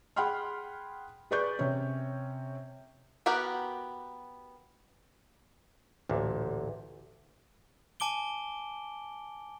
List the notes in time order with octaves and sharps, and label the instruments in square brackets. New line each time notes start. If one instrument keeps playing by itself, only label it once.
[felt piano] G#4 F#5 G5 B5 C6 F6
G#4 B4 D5 C#6 G6
C3 C#4
[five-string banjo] B3 F#4 G4 A#4 F#5
[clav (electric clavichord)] A1 D2 A#2
[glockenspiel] G#5 A5 D6 D7 G7